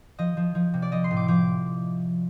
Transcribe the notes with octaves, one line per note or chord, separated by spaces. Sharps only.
F3 D#5
F3
F3
C3
D5
F3 D#5
C6
A2
D6
F3 D6